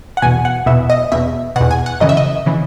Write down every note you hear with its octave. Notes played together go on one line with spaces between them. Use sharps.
F#5
E2 B2 G#5
F#5
E2 B2 E5
D#5
E2 B2 E5
E2 B2 F#5
G#5
F#5
F#2 C#3 E3 D#5
E5
D#5
C#3 E3